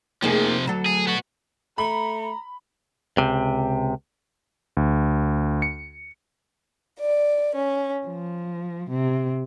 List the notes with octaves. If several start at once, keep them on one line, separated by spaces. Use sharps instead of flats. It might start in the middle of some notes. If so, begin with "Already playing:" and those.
C3 F3 A#3 D#4 G#4
D2 F#3 A4
G#4
B3 F#4
A3 A#5 B5
C#2 C3
D2
C#7
D5
C#4
F3
C3